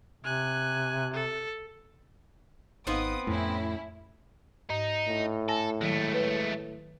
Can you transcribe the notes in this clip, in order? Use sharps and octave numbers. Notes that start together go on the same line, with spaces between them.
C3 G#5 F#6
A4
G#1 B3 C4 D#4 B4 F5 D#6
F2 A2 C#4 E4
G#2 D#4
A2
A4 G#5 A#6
D#3 F#3 G#3 A3
B4 C#5